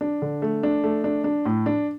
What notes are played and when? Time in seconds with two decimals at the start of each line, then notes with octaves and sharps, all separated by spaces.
0.01 D4
0.22 D3
0.42 A3
0.63 D4
0.84 A3
1.04 D4
1.24 D4
1.45 A2
1.66 D4